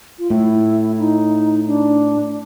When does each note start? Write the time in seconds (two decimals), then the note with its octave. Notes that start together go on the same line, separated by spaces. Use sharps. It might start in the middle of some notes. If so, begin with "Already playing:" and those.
0.19 F4
0.30 A2 E4
0.99 D#4
1.67 D4